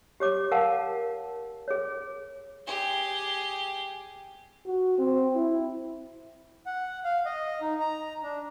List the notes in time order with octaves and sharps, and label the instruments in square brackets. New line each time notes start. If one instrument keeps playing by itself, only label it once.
[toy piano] G4 C#5 D6
A#4 F5 F#5 A5
G#4 C#5
[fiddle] G4 G#4
[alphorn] F#4
C4
E4
[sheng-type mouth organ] F#5
F5
D#5
D#4
A#5
D4